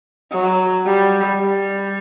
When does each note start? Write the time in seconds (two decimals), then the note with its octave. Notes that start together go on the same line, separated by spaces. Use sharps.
0.33 F#3
0.86 G3
1.39 G3